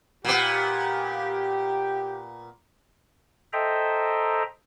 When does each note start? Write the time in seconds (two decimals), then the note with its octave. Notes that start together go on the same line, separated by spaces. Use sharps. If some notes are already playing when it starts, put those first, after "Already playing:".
0.25 A#2 B3 G4
3.53 A4 C5 D#5 E5 G5 A#5